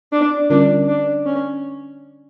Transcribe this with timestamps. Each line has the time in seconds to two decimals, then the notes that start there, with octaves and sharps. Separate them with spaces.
0.12 D4
0.50 D3 G3 C#4 D4 F4 A#4
0.88 D4
1.26 C#4